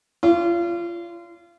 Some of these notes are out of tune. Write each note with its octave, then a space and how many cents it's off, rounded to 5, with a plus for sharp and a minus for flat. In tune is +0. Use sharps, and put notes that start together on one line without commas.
F4 -30 D5 -45